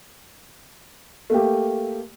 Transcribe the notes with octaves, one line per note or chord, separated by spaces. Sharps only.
A3 A#3 G4